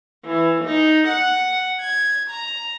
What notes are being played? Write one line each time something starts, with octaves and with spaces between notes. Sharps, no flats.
E3
D#4
F#5
G#6
A#5